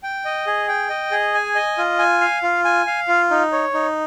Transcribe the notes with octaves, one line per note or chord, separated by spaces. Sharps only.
G5
D#5
G#4
G5
D#5
G#4
G#5
D#5
F4
G#5
F5
F4
G#5
F5
F4
D#4
C#5
D#4